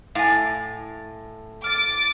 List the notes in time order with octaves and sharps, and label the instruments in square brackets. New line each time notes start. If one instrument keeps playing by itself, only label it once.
[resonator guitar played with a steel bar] A2 [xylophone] F5 G#5
[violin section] D6 A6 [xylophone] F6